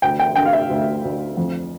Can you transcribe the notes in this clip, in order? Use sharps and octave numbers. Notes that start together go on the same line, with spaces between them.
D2 G5
G5
D3 G5
F5
E5
D2
D2
F2